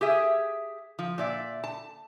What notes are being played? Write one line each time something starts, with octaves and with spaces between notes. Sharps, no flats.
G4 G#4 E5
F3
A#2 D5 E5
A5